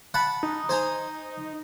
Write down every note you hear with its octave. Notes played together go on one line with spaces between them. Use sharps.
F#5 A5 B5
D#4
C5 G#5 A#5